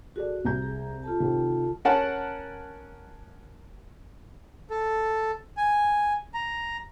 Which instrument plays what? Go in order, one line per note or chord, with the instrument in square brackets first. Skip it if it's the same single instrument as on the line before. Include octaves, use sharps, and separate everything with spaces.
[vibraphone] F#4 [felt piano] G#4 A4 D5
[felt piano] C2 A#5 G6
[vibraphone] G#4
F4 A4 A5
[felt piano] C3 D#3
[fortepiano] C#4 A#4 F#5 A5
[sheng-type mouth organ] A4
G#5
A#5